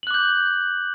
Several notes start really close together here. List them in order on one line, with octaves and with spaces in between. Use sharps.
F#7 F#6 D6 G6